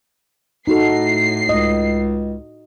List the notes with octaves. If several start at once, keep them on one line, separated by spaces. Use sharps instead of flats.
A2 D#4 F#4 A4 C7
C#2 D#5